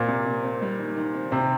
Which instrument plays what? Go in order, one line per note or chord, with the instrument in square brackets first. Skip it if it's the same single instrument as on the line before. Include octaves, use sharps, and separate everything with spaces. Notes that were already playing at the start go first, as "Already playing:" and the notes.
Already playing: [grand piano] A#2 [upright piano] C4
[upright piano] C3
C3
C4
G3
D#3
D#3
C4
[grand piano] C3 [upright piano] C4